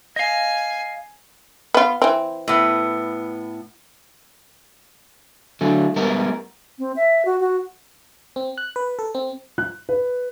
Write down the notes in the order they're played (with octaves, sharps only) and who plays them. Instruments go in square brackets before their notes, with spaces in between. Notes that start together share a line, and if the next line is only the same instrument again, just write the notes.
[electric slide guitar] D#5 F5 [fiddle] G#5
[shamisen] B3 F4
E3 C4
[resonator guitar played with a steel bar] A2 B3
[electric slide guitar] D3 F#3 A3 D4
G3 G#3 B3 A#4
[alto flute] C4
E5
F#4
F#4
[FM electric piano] C4
F#6
B4
A4
C4
[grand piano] F#6
B4